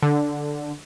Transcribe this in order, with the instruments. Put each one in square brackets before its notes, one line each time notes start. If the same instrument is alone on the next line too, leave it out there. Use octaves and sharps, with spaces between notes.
[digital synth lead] D3